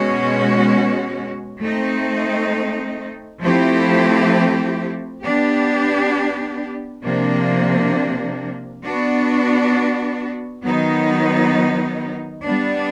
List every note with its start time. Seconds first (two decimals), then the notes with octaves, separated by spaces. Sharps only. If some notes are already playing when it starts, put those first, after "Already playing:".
Already playing: B2 G#3 C#4 F#4
1.61 A3 C4 D#4
3.41 F3 A3 C4 E4 G4
5.23 B3 D4 G4
7.03 C3 F3 A#3 D4
8.83 B3 D4 F#4
10.64 D#3 F#3 B3 D#4
12.45 G3 B3 D4